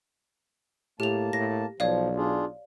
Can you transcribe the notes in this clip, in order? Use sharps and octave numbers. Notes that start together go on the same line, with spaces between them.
A2 A#3 G4 A5 F7
A2 A#6
B1 F3 C#5 D5 F5
D4 F4 G#4